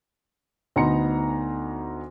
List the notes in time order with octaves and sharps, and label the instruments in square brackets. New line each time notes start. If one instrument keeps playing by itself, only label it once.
[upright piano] D2 B3 D#4 A#5 C6 C#7